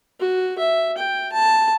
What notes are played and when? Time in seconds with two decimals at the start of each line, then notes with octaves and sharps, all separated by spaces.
0.20 F#4
0.59 E5
0.98 G5
1.33 A5